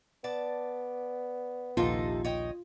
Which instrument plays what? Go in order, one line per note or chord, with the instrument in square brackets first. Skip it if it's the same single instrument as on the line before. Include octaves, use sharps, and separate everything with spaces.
[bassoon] B3 [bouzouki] D5 A5
[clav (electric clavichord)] A#1 D#2 [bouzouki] C3 D#4 A4 [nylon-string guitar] F4
[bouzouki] C#5 D#5 G5